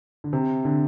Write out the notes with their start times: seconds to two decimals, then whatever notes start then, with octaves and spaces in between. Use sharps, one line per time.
0.24 D3
0.33 C3
0.65 D3